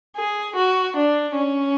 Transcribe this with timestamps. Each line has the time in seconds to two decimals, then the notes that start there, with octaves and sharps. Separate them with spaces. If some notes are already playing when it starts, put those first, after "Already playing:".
0.16 G#4
0.56 F#4
0.96 D4
1.35 C#4